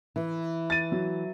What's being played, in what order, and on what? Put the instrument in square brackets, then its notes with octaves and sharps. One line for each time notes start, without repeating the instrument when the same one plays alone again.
[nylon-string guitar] E3
[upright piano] A6 D#7
F#3